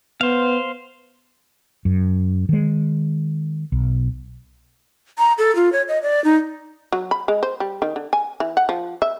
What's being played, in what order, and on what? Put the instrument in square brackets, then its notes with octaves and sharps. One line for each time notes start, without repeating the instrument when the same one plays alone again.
[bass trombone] B3 [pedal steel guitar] C5 F5
[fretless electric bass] F#2
D#3 G#3
B1
[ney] A#5
A4
F4
C#5
D#5
D5
D#4
[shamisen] F#3
B5
G#3
C5
G3
D#3
D3
G#5
E3
F#5
F3
E5